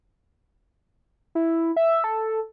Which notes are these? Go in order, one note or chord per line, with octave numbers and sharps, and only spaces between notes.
E4
E5
A4